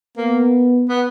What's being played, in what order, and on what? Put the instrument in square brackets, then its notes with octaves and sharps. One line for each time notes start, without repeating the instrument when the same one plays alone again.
[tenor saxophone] A#3 [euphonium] B3
[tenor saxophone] B3